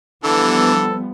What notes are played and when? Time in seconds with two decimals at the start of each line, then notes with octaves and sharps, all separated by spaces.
0.24 D3 E3 F3 G3 B3 A4